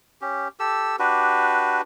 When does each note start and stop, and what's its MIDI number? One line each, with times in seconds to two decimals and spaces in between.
0.21 0.48 61
0.21 0.48 67
0.60 0.96 67
0.60 0.96 69
0.60 0.96 88
0.99 1.81 62
0.99 1.81 66
0.99 1.81 67
0.99 1.81 71